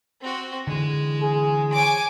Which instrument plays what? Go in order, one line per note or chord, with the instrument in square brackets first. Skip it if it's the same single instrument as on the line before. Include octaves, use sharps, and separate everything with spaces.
[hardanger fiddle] C4 F#4
[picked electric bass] D3 E3 [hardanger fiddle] G#3
[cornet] G#4
[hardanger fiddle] C#5 D6 [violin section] G#5 D7